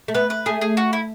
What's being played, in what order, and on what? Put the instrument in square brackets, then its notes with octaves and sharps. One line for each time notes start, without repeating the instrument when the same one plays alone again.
[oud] A3
[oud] B3 [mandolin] B4
[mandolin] B4
[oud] A3 [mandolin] G#4
[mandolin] G#4
F#4
E4